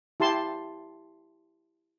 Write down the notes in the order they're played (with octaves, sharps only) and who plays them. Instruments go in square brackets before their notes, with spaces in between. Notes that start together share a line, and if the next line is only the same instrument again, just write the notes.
[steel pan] E4 G4 A5 C6